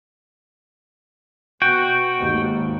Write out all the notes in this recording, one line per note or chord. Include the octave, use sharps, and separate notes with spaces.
B2 F#4 G5
G#1 D#2